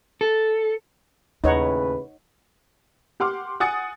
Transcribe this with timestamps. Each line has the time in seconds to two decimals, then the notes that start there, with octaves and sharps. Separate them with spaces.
0.21 A4
1.44 D#2 A2 C#3 D#4 B4 C#5 F#5
3.20 G4 F#5 C6 D6 F6
3.60 F#5 G#5 D#6 A6 C#7